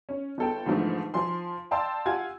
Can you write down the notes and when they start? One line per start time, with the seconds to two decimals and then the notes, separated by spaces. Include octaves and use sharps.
0.09 C#4
0.38 G1 A4 G5
0.66 G#2 D3 E3 F3 A3
1.14 F3 G#5 C6
1.71 D5 F5 G5 A5 C6 E6
2.05 F4 G4 F#5 G#5 G#6